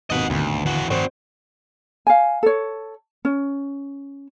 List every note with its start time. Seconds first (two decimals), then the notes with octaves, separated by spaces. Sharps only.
0.10 G#1 D#2 B2 D#5 F#5
0.30 D1 D2 D3 D4
0.66 E3 F#4
0.90 G2 D#3 F3 C4 F#4 C5 D5
2.07 F5 G#5
2.43 A4 C#5
3.25 C#4